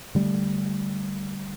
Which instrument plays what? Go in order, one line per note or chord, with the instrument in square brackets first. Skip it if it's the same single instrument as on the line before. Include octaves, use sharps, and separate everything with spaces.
[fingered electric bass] D3 G3 A3